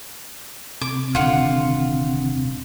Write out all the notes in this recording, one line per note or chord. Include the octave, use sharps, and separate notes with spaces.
C3 D6
D#1 D3 F4 F#5